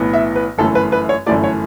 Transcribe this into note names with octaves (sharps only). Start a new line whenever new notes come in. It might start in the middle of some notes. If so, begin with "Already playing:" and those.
Already playing: B1 A2 E3 B3
E5
B4
G1 F#2 E3 A3 A4
B4
B4
C#5
G1 F#2 E3 A3 D5
C#5